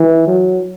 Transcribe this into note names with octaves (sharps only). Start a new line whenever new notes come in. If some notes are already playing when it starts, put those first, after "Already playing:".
Already playing: E3
F#3